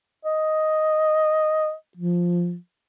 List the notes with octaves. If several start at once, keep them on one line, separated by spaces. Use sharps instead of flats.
D#5
F3